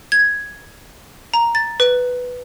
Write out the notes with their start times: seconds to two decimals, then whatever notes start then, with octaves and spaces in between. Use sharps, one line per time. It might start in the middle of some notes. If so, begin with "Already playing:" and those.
0.12 G#6
1.34 A#5
1.55 A6
1.80 B4